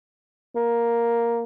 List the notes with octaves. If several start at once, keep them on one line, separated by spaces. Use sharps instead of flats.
A#3